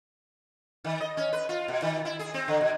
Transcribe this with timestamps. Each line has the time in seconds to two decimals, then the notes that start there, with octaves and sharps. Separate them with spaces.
0.84 D#3
1.01 D#5
1.17 C#4
1.33 B4
1.49 F4
1.68 B2
1.82 D#3
2.05 E4
2.19 G#4
2.34 C4
2.48 D3
2.61 B2